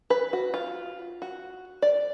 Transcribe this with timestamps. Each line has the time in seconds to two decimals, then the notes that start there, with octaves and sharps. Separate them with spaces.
0.10 B4
0.33 F#4
0.54 F4
1.22 F#4
1.82 D5